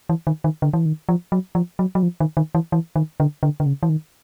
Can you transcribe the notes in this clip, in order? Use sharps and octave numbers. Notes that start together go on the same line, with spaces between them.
E3
D#3
D#3
D3
E3
D#3
F3
F#3
F3
F#3
F#3
F3
D#3
D#3
E3
E3
D#3
D3
D3
D3
C#3
E3
D#3